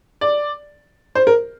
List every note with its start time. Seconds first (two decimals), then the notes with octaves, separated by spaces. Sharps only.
0.21 D5
1.15 C5
1.27 A#4